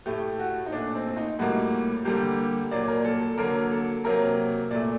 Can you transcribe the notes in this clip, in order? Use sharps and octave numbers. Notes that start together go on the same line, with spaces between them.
A2 A3 G4
F#4
D#4
A#2 A3 D4
C4
D#4
A2 G3 A#3 F#4
D3 G3 A#3 G4
A#2 F#3 A#3 D5
A#4
A4
A4
D3 F#3 A#3 A#4
A4
C3 F#3 A#3 A#4
A#2 A3 D5